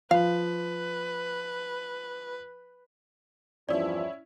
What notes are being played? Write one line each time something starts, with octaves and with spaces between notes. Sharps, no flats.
F3 B4 F5
E2 G2 F3 C#4 E4 D5